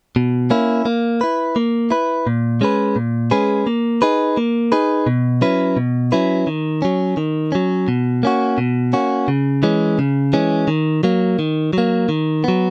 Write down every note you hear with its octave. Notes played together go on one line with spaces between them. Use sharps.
B2
A#3 C#4 E4
A#3
E4 B4
A#3
E4 B4
A#2
G#3 C#4 G#4 B4
A#2
G#3 C#4 G#4 B4
A#3
D#4 G#4 B4
A#3
D#4 G#4 B4
B2
F#3 C#4 E4 B4
B2
F#3 C#4 E4 B4
D#3
F#3 C#4
D#3
F#3 C#4
B2
A#3 C#4 F#4
B2
A#3 C#4 F#4
C#3
E3 G#3 C#4
C#3
E3 G#3 C#4
D#3
F#3 A#3
D#3
F#3 A#3
D#3
F#3 B3